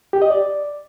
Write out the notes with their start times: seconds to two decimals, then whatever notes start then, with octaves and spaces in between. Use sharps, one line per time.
0.13 G4
0.22 D#5
0.30 D5